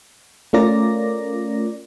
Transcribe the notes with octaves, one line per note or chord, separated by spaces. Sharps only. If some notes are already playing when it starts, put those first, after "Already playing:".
A3 C#4 F4 A#4 D5 A#6